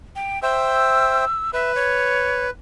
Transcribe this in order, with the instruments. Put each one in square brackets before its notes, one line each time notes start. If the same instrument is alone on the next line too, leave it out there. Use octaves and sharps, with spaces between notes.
[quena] G5
[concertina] C5 E5 G5 [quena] E6
[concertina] B4 [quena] E5
[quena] C#5